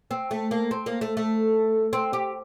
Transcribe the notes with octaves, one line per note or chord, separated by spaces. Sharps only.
C4
A3
A#3
C4
A#3
A3
A3
C4
G4